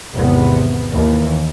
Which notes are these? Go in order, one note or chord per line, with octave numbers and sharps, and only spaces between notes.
G#1 E2 C3 B3
D#2 D#3 E3